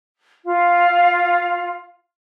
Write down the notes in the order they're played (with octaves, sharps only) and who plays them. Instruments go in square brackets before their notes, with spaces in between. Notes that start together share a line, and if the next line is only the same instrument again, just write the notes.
[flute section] F4 F5